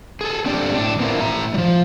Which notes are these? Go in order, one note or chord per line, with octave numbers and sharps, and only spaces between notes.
G#4 A4
C4 D4 G4 A4 D5
A2 C#4 D4
B3 C4 D4 E4 F4 A#4
A2 E5 A#5
F3 G3